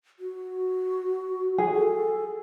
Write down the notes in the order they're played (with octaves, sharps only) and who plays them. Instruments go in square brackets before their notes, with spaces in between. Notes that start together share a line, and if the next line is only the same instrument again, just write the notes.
[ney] F#4
[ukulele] G#4
[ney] A4